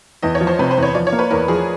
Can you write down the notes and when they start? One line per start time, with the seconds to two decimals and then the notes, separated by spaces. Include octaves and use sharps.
0.23 E2 D#5
0.35 C#5
0.41 F3
0.47 C5
0.59 C3 B4
0.71 C5
0.77 E2
0.83 C#5
0.95 F3 D5
1.07 C#5
1.13 A#3
1.19 B4
1.31 E2 A#4
1.48 F3 G#4